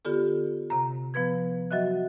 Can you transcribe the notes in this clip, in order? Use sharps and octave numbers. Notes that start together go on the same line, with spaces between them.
D3 B3 F4 G4 A4
C3 A#5
F3 B3 B4 G#6
F#3 F#4 D#5 E5 F#6